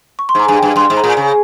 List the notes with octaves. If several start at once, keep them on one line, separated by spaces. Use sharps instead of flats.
C#6
C6
G#2
A#5
G2 G#5
G5
G2 G#5
G2 C6
G#2
A#5
A#2
C#3 G#5